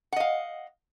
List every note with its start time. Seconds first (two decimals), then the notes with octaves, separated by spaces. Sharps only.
0.12 F#5
0.16 D#5
0.20 F5